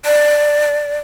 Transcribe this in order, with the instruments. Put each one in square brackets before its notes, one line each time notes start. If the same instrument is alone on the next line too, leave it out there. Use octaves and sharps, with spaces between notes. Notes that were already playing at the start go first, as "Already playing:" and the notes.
[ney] D5